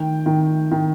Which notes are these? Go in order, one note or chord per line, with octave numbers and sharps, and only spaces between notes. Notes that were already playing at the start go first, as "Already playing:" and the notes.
Already playing: D#3 G5
D#3
D#3